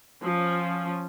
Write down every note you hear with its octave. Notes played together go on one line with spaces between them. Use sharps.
F3 C#4